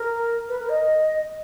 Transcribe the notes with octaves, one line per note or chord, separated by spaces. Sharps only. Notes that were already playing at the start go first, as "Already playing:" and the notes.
Already playing: A#4
B4
A#4
D#5